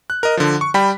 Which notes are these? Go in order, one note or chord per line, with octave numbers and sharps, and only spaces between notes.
F#6
A#4 D#5
D3 F3
C#6
G3 G5 B5 B6